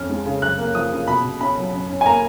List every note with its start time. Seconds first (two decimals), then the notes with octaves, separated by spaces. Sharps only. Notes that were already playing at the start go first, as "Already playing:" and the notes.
Already playing: F2 C#4 F6
0.10 G#3
0.26 C#3
0.42 F#2 F#6
0.58 A#3
0.75 F3 D#6
0.91 C#3
1.08 B2 B5
1.24 B2
1.41 C#4 B5
1.57 F#3
1.73 F#2
1.89 C#4
2.01 G#5
2.06 A#3 A#5